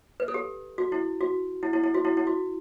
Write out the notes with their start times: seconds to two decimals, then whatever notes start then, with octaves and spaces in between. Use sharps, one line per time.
0.20 B4
0.28 A4
0.34 G4
0.78 F#4
0.92 E4
1.21 F#4
1.63 E4
1.73 E4
1.84 E4
1.94 F#4
2.05 E4
2.17 E4
2.27 F#4